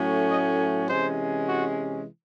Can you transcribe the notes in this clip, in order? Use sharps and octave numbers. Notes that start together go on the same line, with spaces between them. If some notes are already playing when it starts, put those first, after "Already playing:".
Already playing: A2 F#3 A3 C#4
D#5
C3 E3 G#3 C#4 C5
F#4